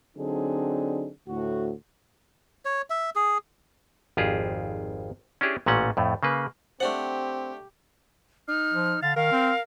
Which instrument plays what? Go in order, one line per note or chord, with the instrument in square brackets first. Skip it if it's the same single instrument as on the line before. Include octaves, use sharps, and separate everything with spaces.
[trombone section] D3 F#3 C4 D4 D#4 G#4
D2 A2 F#4
[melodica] C#5
E5
G#4
[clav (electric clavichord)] G#1 F2 F4 G4 G#4
C#4 D4 E4 G4 G#4
A1 A#2 A3 C#4 F#5
F2 A2 A3
C#3 A#3 B4
[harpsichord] A3 D4 F#5 [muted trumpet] C4 [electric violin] G4 [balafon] C5
[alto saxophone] D#4 [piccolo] F6
[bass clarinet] F3
[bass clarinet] D3 [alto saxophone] F5 [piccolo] A6
[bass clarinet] D#3 [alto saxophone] A#4 [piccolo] F5
[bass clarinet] C4